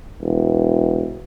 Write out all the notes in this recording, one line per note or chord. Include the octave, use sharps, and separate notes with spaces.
E1